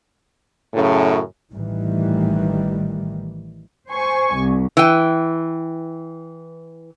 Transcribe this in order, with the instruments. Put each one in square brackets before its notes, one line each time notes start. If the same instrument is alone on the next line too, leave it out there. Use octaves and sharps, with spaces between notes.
[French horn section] F#2 A2 C#3
[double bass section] A1 D#3 E3 G3
[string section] C5 G#5 C#6
C2
[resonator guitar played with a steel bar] E3 G5